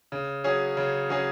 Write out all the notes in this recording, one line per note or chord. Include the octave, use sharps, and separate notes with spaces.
C#3
F#3 C#4 G#4
C#3
F#3 C#4 G#4